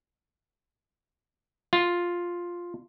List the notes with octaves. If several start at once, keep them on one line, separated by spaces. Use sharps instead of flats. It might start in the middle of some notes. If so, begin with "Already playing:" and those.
F4